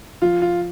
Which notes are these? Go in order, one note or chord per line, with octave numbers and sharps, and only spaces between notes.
F3 F4
F4